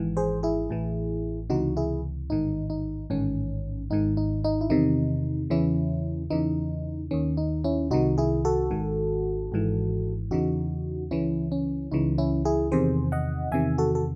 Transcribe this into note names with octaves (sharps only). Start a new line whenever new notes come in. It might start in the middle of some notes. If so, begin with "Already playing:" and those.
Already playing: G#1 G#2 E3
G#4 C5
E4 G#4
A1 A2 E3
C#2 C3 E3 D#4 F#4
E4 G#4
A1 G#2 D#3 D#4
D#4
A1 G#2 D#3 C#4
G#1 G#2 D#3 D#4
D#4
D#4
E4
E2 C3 D#3 D#4
E2 C#3 E3 C#4 E4
E2 C#3 E3 D#4
D#2 D#3 C#4
D#4
C#4 E4
C2 C3 D#3 D#4 F#4
E4 G#4
F#4 A4
G#1 G#2 D#3
G#1 G#2 E3
E2 C#3 E3 D#4 F#4
C#2 C#3 E3 C#4 E4
C#4
C#2 C#3 E3 D#4
C#4 E4
E4 G#4
E2 C3 D#3 G#4 C5
D#5 F#5
E2 C3 D#3 E5 G#5
F#4 A4
A4